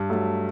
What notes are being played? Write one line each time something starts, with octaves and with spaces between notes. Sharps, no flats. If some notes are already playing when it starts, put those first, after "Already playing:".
Already playing: G2
F#3 A3